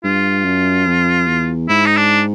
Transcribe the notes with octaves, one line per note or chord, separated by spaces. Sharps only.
G2 F4
F#2
F2
E2
G#2 E4
D#4
D4